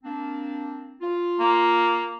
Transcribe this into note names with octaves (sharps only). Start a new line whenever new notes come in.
A#3 C4 D4
F4
A#3